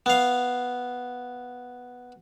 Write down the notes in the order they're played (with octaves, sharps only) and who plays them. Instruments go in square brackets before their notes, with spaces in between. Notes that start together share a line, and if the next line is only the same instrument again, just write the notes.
[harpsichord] B3 F5